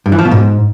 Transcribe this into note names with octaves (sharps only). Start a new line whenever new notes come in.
G2
E3
F3
B2
G#2